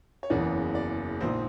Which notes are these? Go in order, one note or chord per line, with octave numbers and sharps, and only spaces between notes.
C#5
F#1 E2 C#3 E3 D5
D5
A#1 G#2 F3 C5